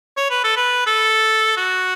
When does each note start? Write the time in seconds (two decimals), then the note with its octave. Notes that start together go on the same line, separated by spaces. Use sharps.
0.17 C#5
0.31 B4
0.44 A4
0.57 B4
0.87 A4
1.57 F#4